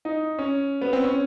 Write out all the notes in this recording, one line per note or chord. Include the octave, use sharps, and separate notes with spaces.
D#4
C#4
B3
C4
C#4